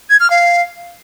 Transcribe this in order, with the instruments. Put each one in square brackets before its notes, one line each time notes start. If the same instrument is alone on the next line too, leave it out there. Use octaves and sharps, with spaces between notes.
[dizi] G#6
F6
F5